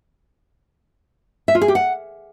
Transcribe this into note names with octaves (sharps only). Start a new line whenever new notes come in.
E5
F4
G#4
G4
F#5